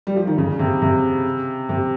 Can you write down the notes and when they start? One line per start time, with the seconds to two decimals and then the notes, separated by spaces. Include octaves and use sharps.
0.07 G3
0.17 F3
0.27 D#3
0.38 C#3
0.59 C3
0.82 C3
1.69 C3